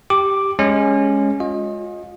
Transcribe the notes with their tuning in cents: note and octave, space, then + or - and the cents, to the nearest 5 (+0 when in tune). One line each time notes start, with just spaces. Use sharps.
G4 +0 D6 +5
G#3 +0 C#4 +0
F4 +35 D#5 +5